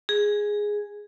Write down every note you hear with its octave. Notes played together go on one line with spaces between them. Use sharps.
G#4